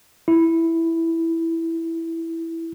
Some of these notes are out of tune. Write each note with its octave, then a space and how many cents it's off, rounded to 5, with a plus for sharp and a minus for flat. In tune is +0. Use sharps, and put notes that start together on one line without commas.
E4 +0